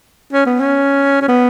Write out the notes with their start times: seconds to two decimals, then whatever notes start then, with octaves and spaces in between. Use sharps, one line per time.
0.33 C#4
0.46 B3
0.61 C#4
1.21 C#4
1.28 B3